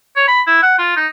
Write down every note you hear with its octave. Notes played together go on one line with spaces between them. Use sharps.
C#5
B5
E4
F#5
F4
D#4